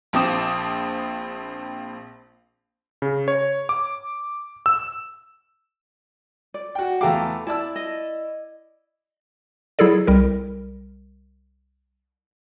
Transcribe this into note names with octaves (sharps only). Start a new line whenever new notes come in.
A#1 F3 C4 D6 D#6 E7
C#3
C#5
D6
E6
D5
F#4 G5
E2 A3 F5 G5 A#5 D6
E4 D5 A5 E6
D#5
F#3 E4 G#4 A4 D5
C2 G3 A#4